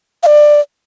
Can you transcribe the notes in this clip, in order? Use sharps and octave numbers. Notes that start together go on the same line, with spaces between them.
F5
D5